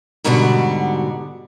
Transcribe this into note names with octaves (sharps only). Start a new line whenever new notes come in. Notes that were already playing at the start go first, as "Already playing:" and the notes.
G#2 B2 D3 G3 D4 F#4